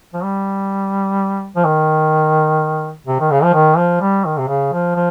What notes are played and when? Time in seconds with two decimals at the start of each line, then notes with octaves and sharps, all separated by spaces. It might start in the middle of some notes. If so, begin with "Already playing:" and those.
0.13 F3
0.23 G3
1.56 F3
1.65 D#3
3.07 C3
3.20 D#3
3.31 C#3
3.43 F3
3.53 D#3
3.77 F3
4.01 G3
4.25 D#3
4.38 C3
4.48 C#3
4.73 F3
4.95 F3